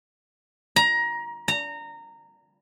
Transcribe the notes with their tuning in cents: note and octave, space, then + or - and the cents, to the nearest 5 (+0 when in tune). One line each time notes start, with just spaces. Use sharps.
A#5 +20
A#5 -20